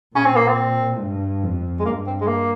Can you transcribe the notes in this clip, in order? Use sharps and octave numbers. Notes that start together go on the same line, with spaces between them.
A#2 C#4
C4
A#3
C4
G2
F2
G#3
G2 A#3
C4
G#3
A#3